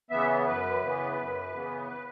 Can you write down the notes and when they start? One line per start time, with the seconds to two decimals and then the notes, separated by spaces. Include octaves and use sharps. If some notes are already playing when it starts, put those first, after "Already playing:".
0.10 C#3 E3 B3 E5
0.46 F#2 B4
0.81 C#3 E3 B3
1.17 F#2
1.53 C#3 E3 B3
1.87 B4